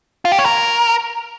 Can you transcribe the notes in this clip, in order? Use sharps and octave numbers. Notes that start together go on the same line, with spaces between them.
F4
G4
C#5
A#4